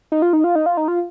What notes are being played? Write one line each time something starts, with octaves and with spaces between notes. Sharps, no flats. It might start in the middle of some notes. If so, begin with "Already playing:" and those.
D#4
F4
D#4
F4
D#4
F4
D#4
F4